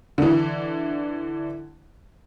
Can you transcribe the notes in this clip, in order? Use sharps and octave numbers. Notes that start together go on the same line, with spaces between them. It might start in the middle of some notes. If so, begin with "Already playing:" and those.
D3 E3